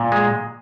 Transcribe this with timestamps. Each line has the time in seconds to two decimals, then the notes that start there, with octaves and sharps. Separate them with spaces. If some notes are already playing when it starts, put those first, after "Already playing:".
Already playing: A#2
0.12 G#3